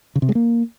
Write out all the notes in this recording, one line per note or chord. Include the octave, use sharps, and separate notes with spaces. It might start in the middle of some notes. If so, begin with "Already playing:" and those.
C#3
C3
G#3
A#3